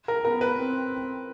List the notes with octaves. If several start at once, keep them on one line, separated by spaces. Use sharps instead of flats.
A#4
B3 A#4
B4
C4